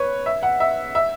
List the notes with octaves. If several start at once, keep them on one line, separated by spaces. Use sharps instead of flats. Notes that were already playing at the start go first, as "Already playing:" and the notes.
Already playing: B4 C#5
E5
F#5
E5
E5